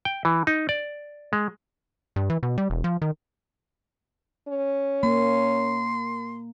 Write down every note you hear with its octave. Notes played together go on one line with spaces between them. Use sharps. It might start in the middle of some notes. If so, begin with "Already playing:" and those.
G5
E3
D#4
D5
G#3
G2
E3
B2
G3
E1
F3
D#3
C#4
A#3 C6